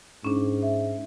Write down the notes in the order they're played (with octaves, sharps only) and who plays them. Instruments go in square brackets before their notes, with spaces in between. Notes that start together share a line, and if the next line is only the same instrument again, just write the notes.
[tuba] G#2 [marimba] C#4 D4
[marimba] E5